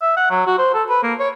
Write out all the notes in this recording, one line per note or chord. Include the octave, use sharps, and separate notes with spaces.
E5
F#5
F#3
F#4
C5
A4
B4
A#3
C#5